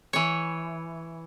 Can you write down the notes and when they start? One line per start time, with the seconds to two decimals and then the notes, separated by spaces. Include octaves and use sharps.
0.13 E3 C#5